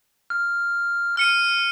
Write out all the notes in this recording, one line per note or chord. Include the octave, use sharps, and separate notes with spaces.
F6
F6 C#7 D#7